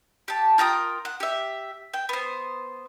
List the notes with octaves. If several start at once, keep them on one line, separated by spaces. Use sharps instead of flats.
G4 A5
F4 A#4 G5 D#6
F#5
G4 E5
G5
B3 C5